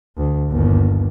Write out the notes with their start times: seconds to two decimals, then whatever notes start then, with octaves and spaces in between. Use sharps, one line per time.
0.17 D2
0.50 G1 D#2